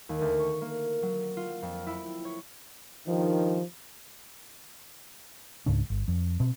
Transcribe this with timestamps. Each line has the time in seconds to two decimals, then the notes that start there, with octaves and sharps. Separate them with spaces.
0.09 D#2
0.21 D2
0.39 C#6
0.62 A#3
1.02 F#3
1.37 F4
1.62 F2
1.87 E4
2.25 C#5
3.07 G2 D#3 F3
5.66 C#2 G#2 C#3 D4
5.90 G1
6.08 F2
6.40 B2 C4